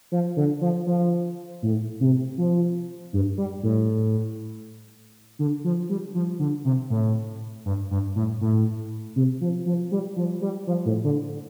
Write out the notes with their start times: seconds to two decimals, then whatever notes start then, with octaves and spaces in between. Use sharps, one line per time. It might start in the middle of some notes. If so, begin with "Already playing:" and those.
0.12 F3
0.37 D3
0.61 F3
0.87 F3
1.62 A2
2.00 C3
2.38 F3
3.13 G2
3.38 G3
3.63 A2
5.39 D3
5.64 F3
5.89 G3
6.14 F3
6.39 D3
6.65 C3
6.90 A2
7.65 G2
7.91 G2
8.16 A2
8.41 A2
9.16 C3
9.41 F3
9.66 F3
9.91 G3
10.16 F3
10.42 G3
10.67 F3
10.85 A2
11.04 D3